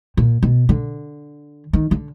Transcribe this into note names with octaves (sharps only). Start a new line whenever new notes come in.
A#2
B2
D3
D#3
D3